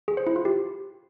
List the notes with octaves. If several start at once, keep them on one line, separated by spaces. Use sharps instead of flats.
G#4
C5
E4
F4
G4